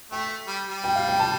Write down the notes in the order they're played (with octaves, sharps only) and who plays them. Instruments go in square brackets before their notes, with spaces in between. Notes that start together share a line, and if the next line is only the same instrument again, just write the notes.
[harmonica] A3 [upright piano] G5
[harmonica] G3
G3
[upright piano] G5
F5
G5
A5